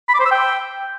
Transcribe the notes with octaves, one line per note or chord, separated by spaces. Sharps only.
B5
D6
C5
E6
G5